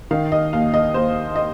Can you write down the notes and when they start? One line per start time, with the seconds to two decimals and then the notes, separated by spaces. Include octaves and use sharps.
0.11 D#3 F5
0.32 D#5
0.53 D#2 F5
0.74 D#5
0.94 D#2 C5
1.36 D#5